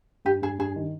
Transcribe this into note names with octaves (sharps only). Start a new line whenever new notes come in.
G2 G4
G2 G#4
G2 G#4
D#3